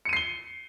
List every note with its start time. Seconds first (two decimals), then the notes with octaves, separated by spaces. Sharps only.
0.05 C#7
0.09 D#7
0.13 C7
0.16 G7